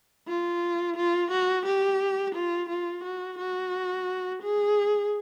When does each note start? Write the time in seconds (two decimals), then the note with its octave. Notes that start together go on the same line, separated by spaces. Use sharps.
0.28 F4
0.97 F4
1.31 F#4
1.66 G4
2.35 F4
2.69 F4
3.04 F#4
3.39 F#4
4.42 G#4